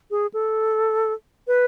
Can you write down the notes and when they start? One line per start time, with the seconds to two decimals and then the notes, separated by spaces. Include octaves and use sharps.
0.11 G#4
0.34 A4
1.48 B4